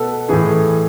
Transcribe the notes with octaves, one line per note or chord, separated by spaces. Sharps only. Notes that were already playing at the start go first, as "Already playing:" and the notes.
Already playing: B2 A4 B4
A2 E3 G#4